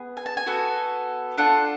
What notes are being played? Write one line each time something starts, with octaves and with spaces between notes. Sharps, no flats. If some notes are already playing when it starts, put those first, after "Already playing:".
Already playing: B3 G#4
G#5
A5
G#5
B3 F#4 A4
D4 F4 A4 F#5